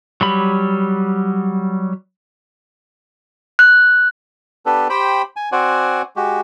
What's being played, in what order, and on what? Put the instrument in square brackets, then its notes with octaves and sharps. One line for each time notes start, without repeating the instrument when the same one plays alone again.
[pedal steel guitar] F#3 G3 B5
[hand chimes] F#6
[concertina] B3 D4 G4 A4 B4
G4 C5 G5 B5
G#5
C4 F#4 C5 D5 F#5 G#5
G#3 F#4 G4